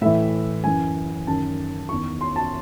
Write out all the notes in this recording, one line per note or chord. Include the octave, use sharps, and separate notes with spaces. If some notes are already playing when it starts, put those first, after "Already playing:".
A2 E3 E5
F#2 E3 G#5
F#2 D#3 A5
E2 D#3 C#6
C6
A5